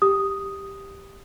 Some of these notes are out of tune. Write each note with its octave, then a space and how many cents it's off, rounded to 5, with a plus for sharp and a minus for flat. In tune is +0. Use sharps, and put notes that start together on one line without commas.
G4 +5 D#6 +0